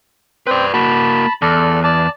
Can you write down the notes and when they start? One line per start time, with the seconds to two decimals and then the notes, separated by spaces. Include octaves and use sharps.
0.47 C4 B4 D5 G5
0.74 A#3 F#4 A5 B5
1.42 E2 A4 D5
1.84 D5 A5